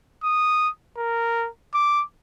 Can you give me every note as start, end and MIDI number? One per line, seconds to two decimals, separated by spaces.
0.23 0.69 87
0.97 1.48 70
1.74 2.03 86